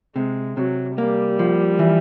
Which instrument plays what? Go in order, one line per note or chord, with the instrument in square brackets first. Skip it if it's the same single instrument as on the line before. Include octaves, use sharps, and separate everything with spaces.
[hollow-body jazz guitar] C3 [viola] G#3
[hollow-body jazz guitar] C3 [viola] F#3
[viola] G3 [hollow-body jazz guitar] A#3
[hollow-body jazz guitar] F3
E3